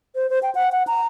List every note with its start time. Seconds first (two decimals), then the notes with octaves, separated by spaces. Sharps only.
0.15 C5
0.30 C5
0.43 G5
0.55 F#5
0.72 F#5
0.87 A#5